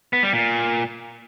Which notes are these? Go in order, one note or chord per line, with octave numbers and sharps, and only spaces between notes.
B3
G3
A#2